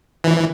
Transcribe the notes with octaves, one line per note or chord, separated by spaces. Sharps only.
E3